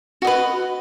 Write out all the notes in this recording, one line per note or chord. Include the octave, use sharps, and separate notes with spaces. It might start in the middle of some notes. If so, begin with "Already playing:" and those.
F#4 B4 D#5